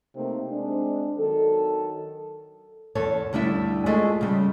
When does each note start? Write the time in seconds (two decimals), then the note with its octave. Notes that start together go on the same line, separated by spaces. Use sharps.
0.15 C3 A3 A#3 C4 D#4
0.51 G#3 C4 D4
1.19 D#3 F#3 A4
2.95 E2 A4 C#5
3.33 D2 G3 D4 E4 E5
3.86 G#3 A3 F4 G#4 A4
4.21 C#3 G3